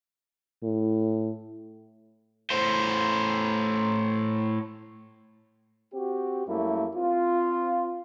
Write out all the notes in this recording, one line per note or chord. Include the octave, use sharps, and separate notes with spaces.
A2
A2 C5
C4 F#4 G4
F#2 G3 A3 A#3 E4
C4 F4